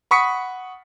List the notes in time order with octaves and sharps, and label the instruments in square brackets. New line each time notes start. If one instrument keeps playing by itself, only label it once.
[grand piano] F#5 B5 C#6 D#6 B6 C#7